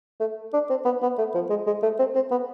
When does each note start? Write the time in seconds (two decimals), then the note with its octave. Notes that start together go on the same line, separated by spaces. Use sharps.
0.20 A3
0.53 D4
0.70 C4
0.85 B3
1.02 B3
1.18 A3
1.35 F3
1.50 G#3
1.67 G#3
1.83 A3
1.99 C4
2.15 C4
2.31 B3